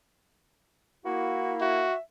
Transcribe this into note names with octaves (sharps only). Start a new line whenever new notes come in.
A#3 E4 F#4
F#4 E5